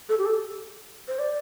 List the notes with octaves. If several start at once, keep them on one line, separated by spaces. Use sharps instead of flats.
A4
G4
A4
C5
D5